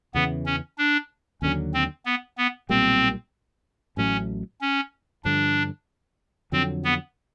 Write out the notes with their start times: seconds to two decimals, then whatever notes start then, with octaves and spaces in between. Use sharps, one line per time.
0.14 E2 C#3 E3 B3
0.46 C#4
0.78 D4
1.42 D#2 D3 F#3 C#4
1.74 C4
2.06 B3
2.38 B3
2.69 B1 A#2 G3 A#3 C4
3.97 A1 A2 F#3 A3 C#4
4.61 C#4
5.25 G2 D3 F3 D4
6.52 F2 D3 F#3 C4
6.85 B3